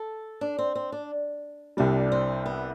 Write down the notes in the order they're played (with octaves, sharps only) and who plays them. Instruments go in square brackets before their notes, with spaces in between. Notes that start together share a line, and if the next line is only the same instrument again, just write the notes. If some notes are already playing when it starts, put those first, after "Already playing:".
Already playing: [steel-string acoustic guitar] A4
D4
C4
C4
D4
[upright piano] C2 C3 G3 [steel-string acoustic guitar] D4
[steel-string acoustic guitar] C4
B3